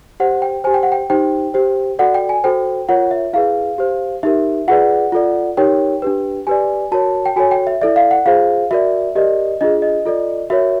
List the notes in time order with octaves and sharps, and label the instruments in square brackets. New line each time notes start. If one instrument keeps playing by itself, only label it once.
[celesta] G4 C5 F#5
G5
G4 C5 G#5
G5
F#5
G5
D#4 G4 C5 G5
G4 C5
F#4 A4 D5 F#5
G5
G#5
F#4 A4 C5 G5
F4 A#4 C#5 F#5
E5
E4 G#4 B4 F5
G4 C5
D#4 G4 A#4 E5
F4 G#4 B4 D5 F#5
F4 A4 D5
D#4 G4 A#4 C#5 G5
D4 G4 B4
G4 B4 D5 G#5
F#4 A#4 C#5 A5
G5
F#4 A4 C#5 G#5
G5
E5
E4 A4 D5 E5
F5
F#5
F4 G#4 C5 F5
F#4 A#4 D5 E5
G4 A#4 D5 D#5
D4 F4 G#4 D#5
D#5
F4 A4 D5
F#4 A#4 C#5 E5